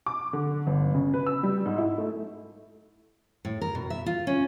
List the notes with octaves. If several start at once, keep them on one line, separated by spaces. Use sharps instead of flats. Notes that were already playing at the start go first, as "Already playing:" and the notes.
D6
D3
G1
C#3
B4
E6
G3
G#2
E4
A3
A2
A#4
B2
E5
F4
C#4